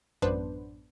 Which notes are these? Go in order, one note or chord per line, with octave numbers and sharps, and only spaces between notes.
A1 F#2 B3 D4 B4 C5